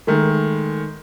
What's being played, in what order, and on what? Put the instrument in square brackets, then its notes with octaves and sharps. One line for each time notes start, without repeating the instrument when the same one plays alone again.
[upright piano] D#3 G#3 A3